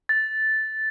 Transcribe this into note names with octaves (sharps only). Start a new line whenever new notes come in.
A6